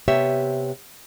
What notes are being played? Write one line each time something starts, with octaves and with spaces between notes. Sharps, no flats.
C3 B3 G4 C#5 E5